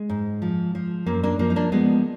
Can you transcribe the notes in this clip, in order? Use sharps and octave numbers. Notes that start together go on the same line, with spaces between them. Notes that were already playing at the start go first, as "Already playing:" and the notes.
Already playing: G#3
G#2
F3
F3
F#2 A#3
A#3 D4
F3 A#3
D#4
A#3 D4
F3 G#3 B3